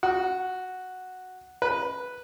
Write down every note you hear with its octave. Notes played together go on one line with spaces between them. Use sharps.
F#4
B4